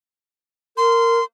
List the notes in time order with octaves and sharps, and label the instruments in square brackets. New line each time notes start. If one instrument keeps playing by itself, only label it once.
[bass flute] A#4 [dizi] C6